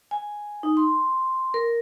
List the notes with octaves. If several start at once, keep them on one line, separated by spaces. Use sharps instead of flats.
G#5
D#4
C6
A#4